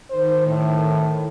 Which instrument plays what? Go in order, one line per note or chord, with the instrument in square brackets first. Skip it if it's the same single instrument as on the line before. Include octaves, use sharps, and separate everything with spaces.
[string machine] D#3 [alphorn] C5
[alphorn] A2